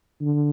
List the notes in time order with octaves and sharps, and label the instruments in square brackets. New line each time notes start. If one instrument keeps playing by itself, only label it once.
[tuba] D3